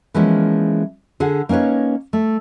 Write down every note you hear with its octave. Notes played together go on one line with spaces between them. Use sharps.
E3 F3 G#3 A#3 B3 C#4
D3 G#4 F#5
A#3 C#4 D#4 B4 C#5
A3